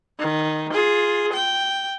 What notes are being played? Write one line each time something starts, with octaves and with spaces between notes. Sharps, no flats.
D#3
F4 G#4
G5